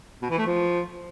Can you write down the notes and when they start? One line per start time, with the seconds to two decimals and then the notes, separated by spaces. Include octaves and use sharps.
0.22 B2
0.30 E3
0.38 A3
0.46 F3